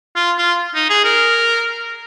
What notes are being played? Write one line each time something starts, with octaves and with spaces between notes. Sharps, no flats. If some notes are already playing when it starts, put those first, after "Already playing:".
F4
F4
D#4
G#4
A#4